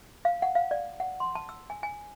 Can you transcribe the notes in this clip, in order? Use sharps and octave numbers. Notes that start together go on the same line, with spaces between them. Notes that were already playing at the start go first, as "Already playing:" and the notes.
F5
F#5
F5
D5
F#5
C6
A5
E6
G#5
G#5